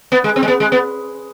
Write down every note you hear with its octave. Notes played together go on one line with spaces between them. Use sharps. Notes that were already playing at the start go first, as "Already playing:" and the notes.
B3
G#3
C4
G#3
B3
G#3
B3